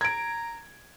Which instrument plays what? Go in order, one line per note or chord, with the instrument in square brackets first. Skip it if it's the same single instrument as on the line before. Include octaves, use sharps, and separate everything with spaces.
[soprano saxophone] A#5 [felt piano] G#6 D7